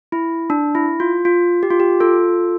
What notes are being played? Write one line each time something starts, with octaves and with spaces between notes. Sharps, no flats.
E4
D4
E4
F4
F4
G4
F4
G4
F4 A4